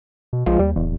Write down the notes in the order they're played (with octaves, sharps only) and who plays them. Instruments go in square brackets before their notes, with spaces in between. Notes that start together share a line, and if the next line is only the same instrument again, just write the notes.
[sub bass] B2
[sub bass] A#1 [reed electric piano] F3 G#3 F4
[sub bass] D#2 [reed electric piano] G3
[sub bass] D1 [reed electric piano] E2